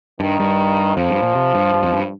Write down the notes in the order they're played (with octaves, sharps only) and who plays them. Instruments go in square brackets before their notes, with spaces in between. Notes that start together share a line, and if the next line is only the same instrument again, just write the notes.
[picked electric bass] G2 [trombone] D#3
[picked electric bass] G2
[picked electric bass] F2 [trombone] F3
[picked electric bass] G2
A#2
C3
G2
G2
F2
G2